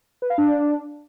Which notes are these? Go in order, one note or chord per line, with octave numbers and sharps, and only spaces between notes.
B4
F5
D4